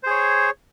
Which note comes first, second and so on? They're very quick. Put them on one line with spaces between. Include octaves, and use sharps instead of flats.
C5 G#4 C#5